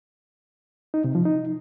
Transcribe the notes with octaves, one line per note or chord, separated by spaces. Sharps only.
D#4
C3
F3
D#4